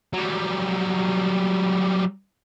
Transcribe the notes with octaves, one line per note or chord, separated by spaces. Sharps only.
F#3 G3